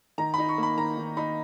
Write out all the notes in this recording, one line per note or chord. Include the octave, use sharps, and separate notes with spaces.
D#3 A#5
D#4 B5
C#6
A#3
B5
D#3 A#5
D#3
D#4 B5